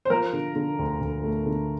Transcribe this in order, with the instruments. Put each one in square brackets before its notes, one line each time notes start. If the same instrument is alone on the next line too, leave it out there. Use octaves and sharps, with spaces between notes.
[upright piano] C5
[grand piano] F3 [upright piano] A#4
[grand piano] D3
D3
D2
D2
A3
D3